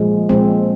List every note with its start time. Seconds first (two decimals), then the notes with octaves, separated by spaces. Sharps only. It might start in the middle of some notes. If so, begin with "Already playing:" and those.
Already playing: A#2 F3 G#3
0.29 A#2 F3 G#3 C4